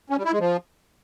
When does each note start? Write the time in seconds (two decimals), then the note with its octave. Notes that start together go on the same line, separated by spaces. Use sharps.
0.09 C#4
0.17 G3
0.25 E4
0.32 G#3
0.40 F3